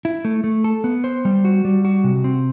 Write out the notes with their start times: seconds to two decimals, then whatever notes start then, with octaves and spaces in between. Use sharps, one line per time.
0.05 E4
0.25 A3
0.44 A3
0.64 A4
0.84 B3
1.04 C5
1.25 G3
1.45 F#4
1.65 G3
1.85 F#4
2.04 C3
2.24 C4